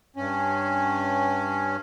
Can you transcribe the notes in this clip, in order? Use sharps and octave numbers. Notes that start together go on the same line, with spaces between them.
G2 C#4